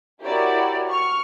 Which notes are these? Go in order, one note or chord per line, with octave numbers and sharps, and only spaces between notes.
E4 F#4 G4 A#4 C#5 D5
C#6 F6